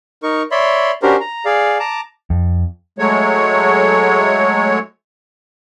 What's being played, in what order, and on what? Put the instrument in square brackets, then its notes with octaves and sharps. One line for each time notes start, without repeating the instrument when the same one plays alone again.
[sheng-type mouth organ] D#4 A#4 C#6
C#5 D5 E5 B5 C6
C#4 D4 F#4 G4 A#4 C5
A#5
G#4 D5 F5
A5 A#5 D6
[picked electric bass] F2
[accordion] F#3 G#3 A3 C#5